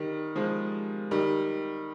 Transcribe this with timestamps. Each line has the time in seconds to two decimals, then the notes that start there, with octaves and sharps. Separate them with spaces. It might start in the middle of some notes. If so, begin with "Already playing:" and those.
Already playing: D#3 G3
0.36 F3 G#3
1.11 D#3 G3